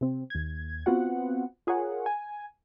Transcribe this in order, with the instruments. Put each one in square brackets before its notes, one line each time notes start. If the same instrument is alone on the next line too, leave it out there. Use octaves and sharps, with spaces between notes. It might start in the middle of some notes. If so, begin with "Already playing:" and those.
[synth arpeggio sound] C3 C4
D#2 G#6
B3 C4 F4 F#4 F#5
F4 G#4 A#4 C#5 F#5
G#5